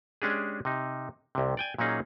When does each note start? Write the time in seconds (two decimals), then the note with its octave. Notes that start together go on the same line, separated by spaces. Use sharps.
0.22 G#3 C#4 D4 G4 G#4
0.65 C3 D#4
1.35 C2 C3
1.57 D5 G5 G#5
1.78 A#2 F#3 A#3 C#4 D#4 G#4